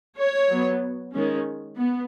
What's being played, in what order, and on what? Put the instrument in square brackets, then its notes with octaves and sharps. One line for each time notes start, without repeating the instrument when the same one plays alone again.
[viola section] C#5
F#3 B3
D#3 G#3 C#4
B3